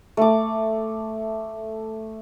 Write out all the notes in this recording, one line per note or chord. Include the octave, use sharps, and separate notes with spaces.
A3 D6